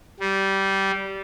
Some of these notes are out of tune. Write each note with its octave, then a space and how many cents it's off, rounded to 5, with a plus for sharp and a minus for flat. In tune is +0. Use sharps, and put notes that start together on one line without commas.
G3 -15